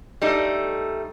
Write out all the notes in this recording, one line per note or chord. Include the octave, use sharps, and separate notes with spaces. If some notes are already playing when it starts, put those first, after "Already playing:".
G3 A3 D#4